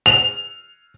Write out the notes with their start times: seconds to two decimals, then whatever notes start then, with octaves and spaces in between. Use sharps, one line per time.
0.06 F7